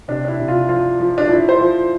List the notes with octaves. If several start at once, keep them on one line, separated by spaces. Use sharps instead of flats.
C3 D4
D4
E4
C3
F4
F3 F4
F3
D4
F3 E4
C5
F3